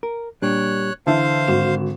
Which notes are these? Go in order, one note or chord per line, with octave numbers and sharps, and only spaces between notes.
A#4
A#2 G3 D4 C#5 F#6
D3 E3 C5 E5 F5 A5
G#1 F#4 E7